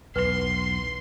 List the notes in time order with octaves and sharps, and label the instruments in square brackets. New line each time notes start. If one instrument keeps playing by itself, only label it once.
[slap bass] B1 E2 [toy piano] B4 [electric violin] C6